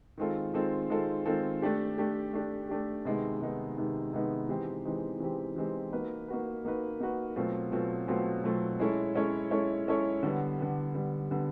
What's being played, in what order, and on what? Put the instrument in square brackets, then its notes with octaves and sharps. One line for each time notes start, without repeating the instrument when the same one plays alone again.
[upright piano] D#3 G#3 C4 F4 A4
D#3 G#3 C4 F4 A4
D#3 G#3 C4 F4 A4
D#3 G#3 C4 F4 A4
A3 D4 G4
A3 D4 G4
A3 D4 G4
A3 D4 G4
C3 D#3 G#3 B3 D#4
C3 D#3 G#3 B3 D#4
C3 D#3 G#3 B3 D#4
C3 D#3 G#3 B3 D#4
E3 G#3 C4 D#4 G4
E3 G#3 C4 D#4 G4
E3 G#3 C4 D#4 G4
E3 G#3 C4 D#4 G4
A#3 D#4 F#4 B4
A#3 D#4 F#4 B4
A#3 D#4 F#4 B4
A#3 D#4 F#4 B4
B2 F#3 A3 C4 F4
B2 F#3 A3 C4 F4
B2 F#3 A3 C4 F4
B2 F#3 A3 C4 F4
G#3 C#4 E4 A4 C#5
G#3 C#4 E4 A4 C#5
G#3 C#4 E4 A4 C#5
G#3 C#4 E4 A4 C#5
D3 G3 B3
D3 G3 B3
D3 G3 B3
D3 G3 B3